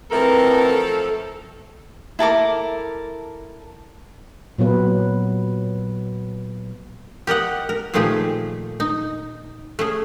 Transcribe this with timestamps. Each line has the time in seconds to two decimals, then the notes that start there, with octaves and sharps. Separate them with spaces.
0.11 B2 E3 F3 A3 C4 A4 A#4
2.19 E4 A4 A#4 D6
4.58 A#2 F#3 B3 B4
7.27 G4 A#4 D#5 F#5
7.69 A#4
7.94 A#2 D#3 F3 A3 G4 G#4
8.80 D#4
9.79 A3 C#4 G#4